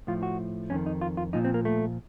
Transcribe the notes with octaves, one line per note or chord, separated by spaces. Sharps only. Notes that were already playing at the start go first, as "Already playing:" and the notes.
A2 F3 F4
F#4
F2 D#3 C#4
D#4
F4
F4
A#2 F3 D#4
C4
A#3
A3